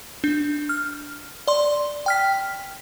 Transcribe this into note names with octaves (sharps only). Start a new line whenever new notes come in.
D4
F6
D5 C6
G5 F6 B6